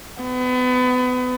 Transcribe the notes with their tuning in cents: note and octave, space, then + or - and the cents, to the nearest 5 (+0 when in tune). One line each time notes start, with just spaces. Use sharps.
B3 +30